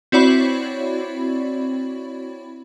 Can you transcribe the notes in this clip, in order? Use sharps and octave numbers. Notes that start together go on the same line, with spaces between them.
C4 E4 F#4 C#5 D5 B5